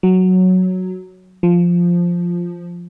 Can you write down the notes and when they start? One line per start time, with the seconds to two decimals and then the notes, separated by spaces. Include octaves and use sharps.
0.03 F#3
1.43 F3